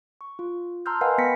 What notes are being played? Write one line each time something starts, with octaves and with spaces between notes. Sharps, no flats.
C#6
F4
A5 A#5 C6 E6 F6 G6
A#4 B4 D#5 F5 F#5 G#5
B3 G5 B5 A#6 B6 C#7